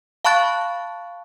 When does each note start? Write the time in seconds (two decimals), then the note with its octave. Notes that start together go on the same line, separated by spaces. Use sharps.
0.25 F5 A5 B5 C#6 F#6 A6